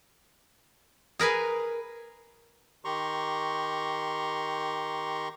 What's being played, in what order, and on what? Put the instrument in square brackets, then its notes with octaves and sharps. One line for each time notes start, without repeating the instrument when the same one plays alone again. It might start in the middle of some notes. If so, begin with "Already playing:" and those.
[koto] G#4 A#4 B4 G#5
[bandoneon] D#3 G4 A#5 C6 C#6